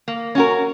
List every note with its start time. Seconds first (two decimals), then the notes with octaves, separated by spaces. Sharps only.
0.08 A#3
0.35 C#4 F#4 A#4